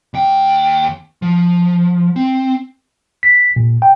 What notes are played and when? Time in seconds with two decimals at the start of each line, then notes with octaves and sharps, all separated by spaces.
0.14 D#2 G5
1.22 F3
2.16 C4
3.23 B6
3.56 A#2
3.82 G5